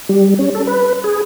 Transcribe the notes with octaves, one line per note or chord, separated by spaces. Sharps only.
G3
C#4
A4
B4
G#4